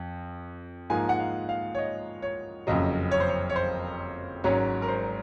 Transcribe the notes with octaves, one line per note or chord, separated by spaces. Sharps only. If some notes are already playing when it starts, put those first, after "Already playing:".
Already playing: F2
G#2 F3 A#3 D#4 G#5
F#5
F5
F5
C#5
D#5
C#5
F#1 F2 C#3 F#3 D#5
C#5
C5
C#5
C#5
C5
G#1 G#2 F#3 C#4 C#5
A#4
C5